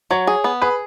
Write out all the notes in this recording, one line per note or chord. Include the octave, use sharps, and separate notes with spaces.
F#3 C#5
G#4
B3
G#4 B4